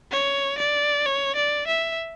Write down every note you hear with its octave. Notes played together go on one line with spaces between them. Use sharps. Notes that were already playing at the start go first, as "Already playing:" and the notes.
C#5
D5
C#5
D5
E5